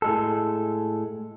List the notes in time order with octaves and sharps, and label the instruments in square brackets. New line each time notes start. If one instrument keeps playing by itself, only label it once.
[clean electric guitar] A2 G#3 A4